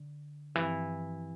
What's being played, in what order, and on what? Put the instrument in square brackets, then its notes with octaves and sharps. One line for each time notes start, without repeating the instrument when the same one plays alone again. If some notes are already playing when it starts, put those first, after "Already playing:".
Already playing: [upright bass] D3
[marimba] G2 F3 C4 [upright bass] E3